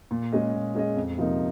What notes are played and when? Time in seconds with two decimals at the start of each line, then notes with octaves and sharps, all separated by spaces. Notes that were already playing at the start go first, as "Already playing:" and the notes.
0.11 A#2
0.32 G#3 C#4 G#4 D#5
0.54 A#2
0.75 G#3 C#4 G#4 D#5
0.96 F2
1.18 C3 F3 A#3 D#4